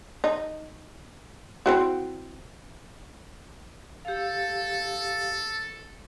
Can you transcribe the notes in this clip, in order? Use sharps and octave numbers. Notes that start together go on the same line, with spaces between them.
D#4
C4 E4 F#4
G4 A4 F5